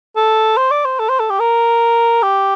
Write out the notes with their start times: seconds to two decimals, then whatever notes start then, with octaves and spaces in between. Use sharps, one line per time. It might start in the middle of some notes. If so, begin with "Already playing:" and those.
0.16 A4
0.57 C5
0.71 D5
0.85 C5
0.99 A4
1.09 C5
1.20 A4
1.30 G4
1.40 A#4
2.23 G4